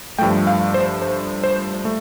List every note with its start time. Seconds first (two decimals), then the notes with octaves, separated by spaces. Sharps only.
0.18 G2 F3 A3 G5
0.47 F5
0.74 C5
1.02 C5
1.44 C5
1.85 A3